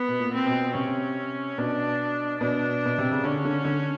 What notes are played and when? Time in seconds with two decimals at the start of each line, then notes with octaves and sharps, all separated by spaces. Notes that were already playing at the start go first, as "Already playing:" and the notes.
Already playing: B3
0.08 B2
0.19 A#2
0.34 C4
0.47 B2
0.75 C3 C#4
1.57 B2 D4
2.40 B2 D4
2.85 B2
2.98 C3
3.11 C#3
3.24 D3 C#4
3.45 D3
3.65 D3